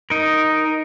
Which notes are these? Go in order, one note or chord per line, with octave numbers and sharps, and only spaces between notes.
D#4 A#4